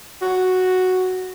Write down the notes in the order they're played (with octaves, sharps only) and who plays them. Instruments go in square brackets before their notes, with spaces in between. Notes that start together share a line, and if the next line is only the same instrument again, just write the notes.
[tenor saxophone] F#4